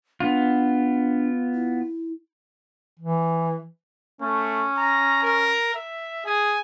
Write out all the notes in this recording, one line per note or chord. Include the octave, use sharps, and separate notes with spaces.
B3 D4 F4
E4
E3
A3 C#4
A#5
A#4
E5
G#4 G#5